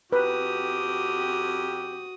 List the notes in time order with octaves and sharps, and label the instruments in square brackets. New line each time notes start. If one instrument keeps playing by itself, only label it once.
[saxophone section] F2 G4 [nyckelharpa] F#4 D#6 [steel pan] B4